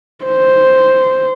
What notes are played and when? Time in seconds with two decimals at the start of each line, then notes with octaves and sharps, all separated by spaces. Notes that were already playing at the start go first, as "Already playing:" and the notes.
0.25 C5